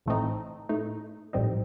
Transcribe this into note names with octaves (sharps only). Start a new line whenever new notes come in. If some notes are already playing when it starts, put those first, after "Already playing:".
A1 A2 A3 C4 D#4
A2 A3 D#4
A#1 A2 G3 C4 D#4